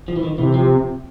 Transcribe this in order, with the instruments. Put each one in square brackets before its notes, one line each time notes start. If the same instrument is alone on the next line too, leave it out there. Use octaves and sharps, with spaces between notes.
[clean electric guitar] F3
E3
D#3
[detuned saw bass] C3 [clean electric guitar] E3
[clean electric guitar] F3